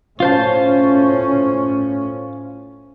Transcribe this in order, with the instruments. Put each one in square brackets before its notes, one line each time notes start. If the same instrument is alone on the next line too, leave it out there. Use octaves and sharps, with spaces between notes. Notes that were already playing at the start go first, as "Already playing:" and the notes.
[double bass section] A2 C#4 [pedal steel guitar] F4 C5 A5